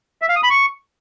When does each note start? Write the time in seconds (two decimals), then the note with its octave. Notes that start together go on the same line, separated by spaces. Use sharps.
0.22 E5
0.29 F5
0.36 D#6
0.43 B5
0.50 C#6